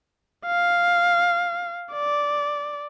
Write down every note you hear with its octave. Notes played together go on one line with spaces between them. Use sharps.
F5
D5